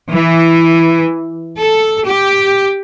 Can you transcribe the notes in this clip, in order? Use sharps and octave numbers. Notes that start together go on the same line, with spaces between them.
E3
A4
G4